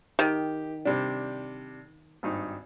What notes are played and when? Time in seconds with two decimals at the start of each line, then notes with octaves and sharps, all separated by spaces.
0.19 D#3 G4
0.85 C3 G3 D4
2.23 G#1 G2 D#4